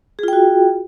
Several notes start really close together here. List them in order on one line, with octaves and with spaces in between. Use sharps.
G#4 F4 G5 F#4